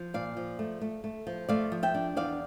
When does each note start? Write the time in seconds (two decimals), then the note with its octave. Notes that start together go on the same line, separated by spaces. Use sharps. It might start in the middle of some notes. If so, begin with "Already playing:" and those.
Already playing: F3
0.14 A#2 D5 F5
0.37 F3
0.59 A3
0.81 A3
1.04 A3
1.27 F3
1.49 A3 D5 F5
1.72 F3
1.83 E5 G5
1.95 D4
2.16 E2 D5 F5